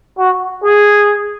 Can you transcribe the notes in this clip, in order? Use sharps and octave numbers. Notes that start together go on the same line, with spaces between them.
F#4
G#4